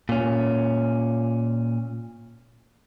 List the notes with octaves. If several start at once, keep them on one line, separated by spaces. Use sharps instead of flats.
A#2 C#4